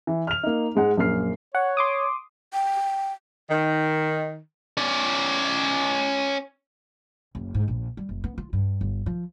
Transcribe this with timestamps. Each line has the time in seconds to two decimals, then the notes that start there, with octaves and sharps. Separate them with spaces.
0.07 E3
0.27 F6 F7
0.43 A#3 D#4
0.75 G#2 G#3 F#5
0.97 A#1 F#2 A#3 F6 C7
1.55 C#5 F#5
1.77 C6 D6 D#6
2.53 G5
3.49 D#3
4.77 C#4 D5
7.35 F#1
7.54 G#2
7.68 A#1
7.97 G3
8.09 F#1
8.24 B3
8.38 F4
8.53 G2
8.81 G1
9.06 F3